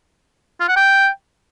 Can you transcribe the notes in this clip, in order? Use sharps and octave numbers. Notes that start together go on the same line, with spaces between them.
F4
F#5
G5